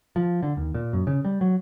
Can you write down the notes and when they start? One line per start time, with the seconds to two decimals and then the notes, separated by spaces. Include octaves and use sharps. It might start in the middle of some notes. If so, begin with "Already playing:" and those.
0.16 F3
0.43 D3
0.57 D#2
0.74 A#2
0.93 F#2
1.07 C#3
1.25 G3
1.41 F#3